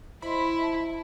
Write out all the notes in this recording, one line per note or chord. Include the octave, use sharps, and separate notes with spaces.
E4 C5 D#5 B5 C6
E5 A5